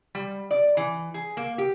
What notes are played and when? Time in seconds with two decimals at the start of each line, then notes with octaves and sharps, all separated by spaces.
0.15 G3
0.51 D5
0.77 E3
1.14 G#4
1.37 A#3
1.58 G4